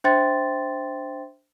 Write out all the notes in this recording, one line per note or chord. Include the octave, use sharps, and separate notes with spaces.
D4 C5 E5 G5 C6 A6